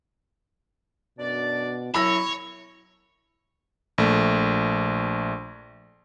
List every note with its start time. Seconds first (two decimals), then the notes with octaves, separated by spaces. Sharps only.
1.19 F#2 B2 D4 D5
1.94 F#2 F#3 E4 C#5 B5 E6 A#6
3.98 A#1 A3